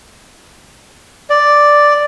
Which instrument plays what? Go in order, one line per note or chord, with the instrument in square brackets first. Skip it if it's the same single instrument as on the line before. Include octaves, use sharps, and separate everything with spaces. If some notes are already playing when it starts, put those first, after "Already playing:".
[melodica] D5